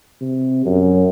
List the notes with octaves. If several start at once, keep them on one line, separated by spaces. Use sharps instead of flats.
C3
F#2